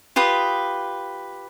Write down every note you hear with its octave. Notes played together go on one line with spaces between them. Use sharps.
F4 G4 B4 D#6